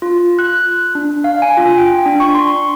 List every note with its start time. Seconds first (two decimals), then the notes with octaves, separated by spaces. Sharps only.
0.02 F4
0.39 F#6
0.95 D4
1.24 F5
1.42 G#5
1.57 F4
1.78 G5
2.06 D4
2.20 C#6
2.35 C6